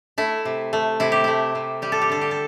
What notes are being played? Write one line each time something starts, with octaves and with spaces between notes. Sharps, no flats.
A3 E4
C3
A3
C3 E4
G4
A3 E4
C3
G3 G4
A4
G4
D3 A4
G4
A4